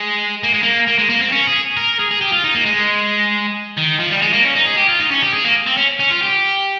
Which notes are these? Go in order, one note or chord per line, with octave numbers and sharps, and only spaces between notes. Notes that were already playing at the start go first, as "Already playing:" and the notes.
Already playing: G#3
A#3
G#3
A#3
A#3
G#3
A#3
C4
C#4
G#4
A#4
G#4
G#4
G4
F4
D#4
A#3
G#3
D#3
F3
G3
G#3
A#3
C#4
D#4
G#4
G4
F4
D#4
C#4
G4
G#4
A#3
C4
C#4
C#4
F4
G4